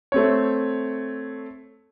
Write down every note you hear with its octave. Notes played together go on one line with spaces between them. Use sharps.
A3 C4 C#5